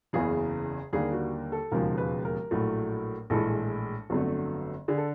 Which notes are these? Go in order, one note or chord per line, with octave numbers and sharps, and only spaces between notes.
F#1 E2 C#3 E3 G#4
D#2 D3 G3 A#3 G#4
F#4
A4
E1 D#2 C#3 F3 G#3 A#4
B4
A#4
A#1 A2 F#3 A3
A#1 A2 E3 G#3 A4
G1 F2 D3 F#3 A3
D3 G#4
A4